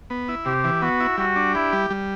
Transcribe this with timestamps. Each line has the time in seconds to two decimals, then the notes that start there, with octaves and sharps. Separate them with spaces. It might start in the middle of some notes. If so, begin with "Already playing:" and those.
0.10 B3
0.29 E4
0.46 C3 G4
0.64 E3
0.82 B3 F#4
1.00 E4
1.18 G3 F#4
1.36 D4
1.54 E4 G4
1.73 G3
1.90 G3